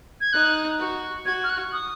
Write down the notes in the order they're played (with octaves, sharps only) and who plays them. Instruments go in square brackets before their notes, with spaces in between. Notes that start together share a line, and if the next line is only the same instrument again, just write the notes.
[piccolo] G#6
[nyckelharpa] D#4 [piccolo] F#6
[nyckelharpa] F#4
[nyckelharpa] F#4 [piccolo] G#6
[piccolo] F6
F#6
D#6